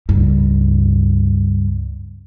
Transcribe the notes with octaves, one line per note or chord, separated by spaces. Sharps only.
C#2 G2